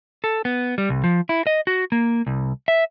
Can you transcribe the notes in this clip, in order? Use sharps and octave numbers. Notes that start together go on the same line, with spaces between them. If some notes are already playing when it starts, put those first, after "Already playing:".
A4
B3
G3
C2
F3
E4
D#5
F#4
A#3
C2
E5